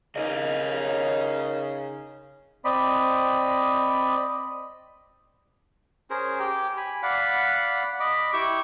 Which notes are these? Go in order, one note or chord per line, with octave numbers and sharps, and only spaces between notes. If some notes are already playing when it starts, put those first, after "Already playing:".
C#3 D#4 A#4 C#5 D#5
C4 D5 D#5 B5
C#4 G#4 A#4 C5
G4 G5
G#5 B5
D5 F5 F#5 B5
D#5 B5 D6
E4 G4 G5 C#6